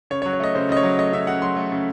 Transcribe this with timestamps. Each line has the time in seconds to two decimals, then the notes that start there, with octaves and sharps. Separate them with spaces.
0.10 C#3 C#5
0.22 C#5
0.26 F#3
0.33 C#5
0.40 A3 D#5
0.55 C#3 C5
0.69 C#3 D#5
0.77 C#5
0.83 F#3
0.99 A3 D#5
1.13 C#3 E5
1.27 C#3 F#5
1.42 F#3 C6
1.57 A3
1.72 C#3